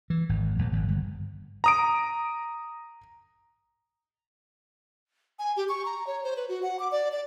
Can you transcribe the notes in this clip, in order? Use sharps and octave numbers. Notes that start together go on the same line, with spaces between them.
E3
G#1
A#1
G#1
G1
A#5 D#6 D7
G#5
G4
C#6
A#5
C#5
C5
B4
F#4
F#5
D6
D5
D5